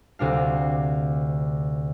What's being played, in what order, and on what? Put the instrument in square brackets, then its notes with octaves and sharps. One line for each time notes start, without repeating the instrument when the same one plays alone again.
[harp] D2 C3 D4 F5